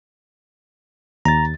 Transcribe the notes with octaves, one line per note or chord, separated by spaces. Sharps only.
D#2 A#5 A6